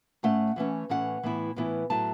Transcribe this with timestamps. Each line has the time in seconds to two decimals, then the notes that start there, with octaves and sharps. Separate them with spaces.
0.23 A2 A3 C#4 F#5
0.56 A2 E3 A3 C#4
0.89 A2 E3 A3 C#4 F#5
1.23 A2 E3 B3 E4
1.56 A2 E3 B3 E4
1.90 A2 F#3 A3 E4 A5